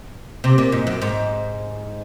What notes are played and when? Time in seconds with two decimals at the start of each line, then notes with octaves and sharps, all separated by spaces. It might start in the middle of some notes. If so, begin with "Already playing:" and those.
0.44 C3
0.58 A#2
0.72 G#2
0.87 F#2
1.02 G#2